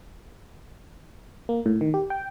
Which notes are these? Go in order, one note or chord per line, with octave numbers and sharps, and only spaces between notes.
A#3
A2
D#3
G4
G5